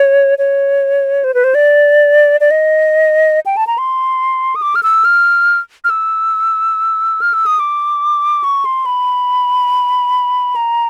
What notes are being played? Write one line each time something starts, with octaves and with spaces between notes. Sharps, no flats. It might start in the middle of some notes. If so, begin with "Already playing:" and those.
Already playing: C#5
C#5
C5
B4
C5
D5
D5
D#5
G5
A5
A#5
C6
D#6
D6
F6
E6
F6
F6
E6
F6
E6
D#6
D6
C#6
C6
B5
A#5